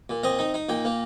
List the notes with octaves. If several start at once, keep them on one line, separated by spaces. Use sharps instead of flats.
A#2
C4 D#5
D#4
D#4
A#2 G5
A#3